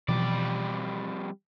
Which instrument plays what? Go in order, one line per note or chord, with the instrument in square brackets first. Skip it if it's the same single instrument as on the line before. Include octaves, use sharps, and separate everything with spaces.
[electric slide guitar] F2 G3 D5 [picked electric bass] B2 E3 F3